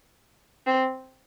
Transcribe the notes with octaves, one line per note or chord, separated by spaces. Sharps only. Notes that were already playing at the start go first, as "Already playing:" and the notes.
C4